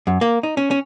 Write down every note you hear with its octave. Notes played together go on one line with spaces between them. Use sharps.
F#2
A#3
D#4
C#4
C#4